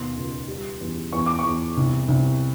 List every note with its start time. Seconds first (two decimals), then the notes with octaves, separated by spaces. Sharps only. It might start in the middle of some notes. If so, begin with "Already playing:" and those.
Already playing: D#2 B2 C6
0.17 C#2
0.48 G3
0.81 E2
1.13 E2 C#6
1.26 D6
1.39 C#6
1.45 E2
1.77 C2
2.08 C2